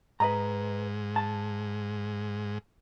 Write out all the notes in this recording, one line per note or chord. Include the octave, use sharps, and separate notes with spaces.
G#2 B4 D#5 A#5
A5